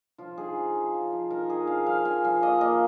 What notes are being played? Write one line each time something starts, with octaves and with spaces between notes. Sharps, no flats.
F3 F4
D#4 G#4
F3
F3
F3
F3
D#4 A#4
D#4 G#4
F3 F5
F3 F5
F3 G#5
F3 F5
A#3 D#5
A#3 D#5